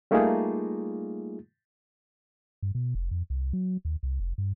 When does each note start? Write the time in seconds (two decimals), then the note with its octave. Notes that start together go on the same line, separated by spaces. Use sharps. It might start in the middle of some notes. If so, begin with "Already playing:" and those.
0.11 G3 A3 A#3 D#4 F4 G#4
2.63 G2
2.75 B2
2.95 F1
3.11 F2
3.30 C2
3.53 F#3
3.85 D#2
4.03 C2
4.20 F1
4.38 G2